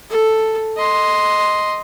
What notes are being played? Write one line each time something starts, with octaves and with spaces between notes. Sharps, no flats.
A4
D#5 C6